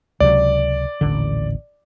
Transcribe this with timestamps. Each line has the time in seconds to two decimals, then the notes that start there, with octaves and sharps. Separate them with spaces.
0.20 C#2 C3 F#3 D5
1.01 D#1 A1 D3